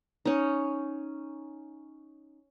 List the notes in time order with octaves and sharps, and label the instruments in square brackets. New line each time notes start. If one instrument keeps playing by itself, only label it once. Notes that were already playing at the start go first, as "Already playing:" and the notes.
[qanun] C#4 D#4